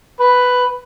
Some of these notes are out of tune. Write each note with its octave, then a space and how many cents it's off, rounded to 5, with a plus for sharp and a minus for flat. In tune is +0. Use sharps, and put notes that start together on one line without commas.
B4 +5